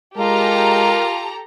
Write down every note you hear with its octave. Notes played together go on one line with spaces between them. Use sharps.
G#3 F4 G4 A4 A#4 A#5